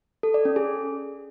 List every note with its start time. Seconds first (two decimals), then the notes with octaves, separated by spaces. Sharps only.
0.23 A4
0.34 D5
0.45 C#4
0.56 G#4